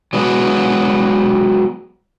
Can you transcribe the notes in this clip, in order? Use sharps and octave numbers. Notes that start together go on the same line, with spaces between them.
F#3 G#3 B3 D4 F#4